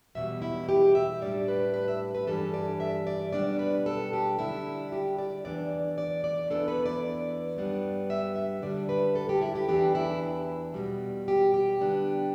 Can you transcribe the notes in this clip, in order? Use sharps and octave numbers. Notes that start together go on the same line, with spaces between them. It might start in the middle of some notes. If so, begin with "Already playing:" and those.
E2 B2 G3 E5
E4
G4
E5
A2 G3 D4 D5
B4
B4
E5
B4
G2 E3 G3 D4 A4
D5
E5
D5
B2 G3 B3 D4 D5
B4
A4
G4
D3 G3 D4 E4
G4
D5
E2 E3 B3 D4 D5
D5
D5
E2 E3 B3 D4 A4
B4
D5
G2 G3 B3 D4
E5
E5
D3 G3 D4 D5
B4
A4
G4
E4
G4
E2 E3 B3 D4 G4
E4
E2 B2 G3
G4
G4
D3 G3 B3 D4